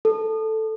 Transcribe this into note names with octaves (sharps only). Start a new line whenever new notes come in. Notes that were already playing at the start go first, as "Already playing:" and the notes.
A4